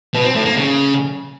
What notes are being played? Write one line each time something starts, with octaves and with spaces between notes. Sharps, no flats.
B2
C4
A2
A#3
C#3